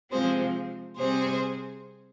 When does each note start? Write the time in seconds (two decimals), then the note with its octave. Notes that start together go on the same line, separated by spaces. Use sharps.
0.11 C3 F3 G#3 C4 G#4 C5
0.97 C3 G3 C4 G#4 C5